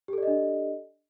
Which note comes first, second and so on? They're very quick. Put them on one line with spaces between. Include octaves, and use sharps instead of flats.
G4 A4 D5 D#5 D4